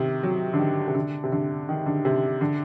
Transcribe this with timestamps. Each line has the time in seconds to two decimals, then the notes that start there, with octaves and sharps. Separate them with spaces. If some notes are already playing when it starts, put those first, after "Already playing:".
Already playing: C3 D#3
0.23 F#3
0.54 D3
0.59 D#3
0.88 C3
0.95 D3
1.24 C3
1.32 D3
1.69 D#3
1.86 D3
2.05 C3
2.41 D3